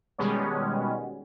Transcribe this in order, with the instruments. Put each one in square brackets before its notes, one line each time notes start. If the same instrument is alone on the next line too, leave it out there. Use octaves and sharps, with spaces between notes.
[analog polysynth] B2 D#3 G3 G#3 B3 C#4